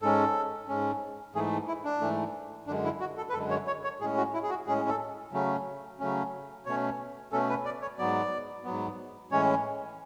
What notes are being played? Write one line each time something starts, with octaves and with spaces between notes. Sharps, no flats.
G#2 G#3 C#4 A4
G#2 G#3 C#4
G#2 E3 A3 G#4
E4
D4
G#2 E3 A3
F#2 D3 G#3 D4
E4
F#4
A4
B4
F#2 D3 G#3 A4
C#5
C#5
C#5
A2 G#3 C#4 G#4
F#4
E4
G#4
F#4
A2 G#3 C#4 G#4
A4
C#3 F#3 A3 C#4
C#3 F#3 A3 C#4
B2 A3 C#4 C#5
B2 A3 C#4 A4
B4
D5
C#5
G#2 F#3 B3 D5
G#2 F#3 B3
A2 E3 G#3 C#4 C#5